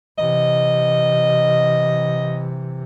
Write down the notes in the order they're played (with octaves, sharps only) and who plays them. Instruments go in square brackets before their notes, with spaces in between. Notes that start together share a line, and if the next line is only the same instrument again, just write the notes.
[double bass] C3 E3 [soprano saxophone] D#5